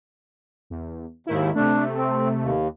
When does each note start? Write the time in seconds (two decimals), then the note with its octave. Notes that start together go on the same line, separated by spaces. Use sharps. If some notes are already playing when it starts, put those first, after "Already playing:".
0.70 E2
1.27 D#2 G#2 D#3 E4
1.55 C3 A3 D4
1.97 C4
2.39 D#2